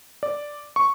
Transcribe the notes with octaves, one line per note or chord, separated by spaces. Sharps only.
D5
C#6